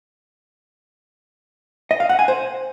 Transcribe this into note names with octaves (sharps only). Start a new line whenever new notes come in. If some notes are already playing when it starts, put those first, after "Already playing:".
D#5
F5
F#5
G#5
C5